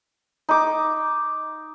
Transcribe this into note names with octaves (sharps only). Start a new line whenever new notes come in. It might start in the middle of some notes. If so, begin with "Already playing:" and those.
D#4 D6